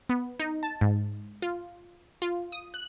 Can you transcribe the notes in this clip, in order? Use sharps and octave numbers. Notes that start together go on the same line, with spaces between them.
B3
D#4
A5
G#2
F4
F4
D#6
F#6